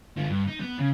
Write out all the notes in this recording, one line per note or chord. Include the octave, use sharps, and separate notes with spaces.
D3 F4
G2
D#4
B3
C#3